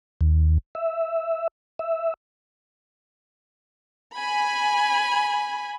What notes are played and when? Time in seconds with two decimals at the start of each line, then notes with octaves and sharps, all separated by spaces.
0.21 D#2
0.75 E5
1.79 E5
4.15 G#5 B5